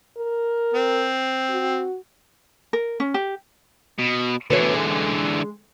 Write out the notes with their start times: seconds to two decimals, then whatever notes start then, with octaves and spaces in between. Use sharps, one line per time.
0.17 A#4
0.74 C4
1.50 F#4
2.73 A#4
3.00 C#4
3.14 G4
3.99 B2
4.50 D3 E3 B3 F#4 C#5
4.74 G#3